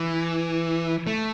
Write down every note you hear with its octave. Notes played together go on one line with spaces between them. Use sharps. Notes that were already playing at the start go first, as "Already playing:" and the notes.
Already playing: E3
A3